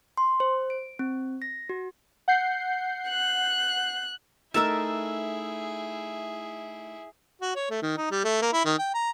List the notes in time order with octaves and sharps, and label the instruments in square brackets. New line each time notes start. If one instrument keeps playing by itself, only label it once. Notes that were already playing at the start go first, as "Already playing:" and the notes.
[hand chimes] C6
C5
D7
C4
A#6
F#4
[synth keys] F#5 G6 C7
[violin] F#6
[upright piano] A3 D#4 [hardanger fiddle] E4 G#4 [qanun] A#4 A5 [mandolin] E5 E6
[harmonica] F#4
C#5
A3
D#3
D#4
G3
A3
A#3
E4
D#3
G5
A#5